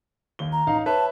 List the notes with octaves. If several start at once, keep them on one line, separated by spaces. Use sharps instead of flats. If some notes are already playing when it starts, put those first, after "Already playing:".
D#2 G7
A#5
A1 D#4 F5
B4 C#5 E5 A5